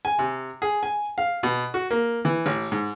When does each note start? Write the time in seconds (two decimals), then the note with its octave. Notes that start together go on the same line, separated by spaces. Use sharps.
0.05 G#5
0.19 C3
0.62 G#4
0.83 G#5
1.18 F5
1.43 B2
1.74 F#4
1.91 A#3
2.25 E3
2.46 A1
2.72 G#2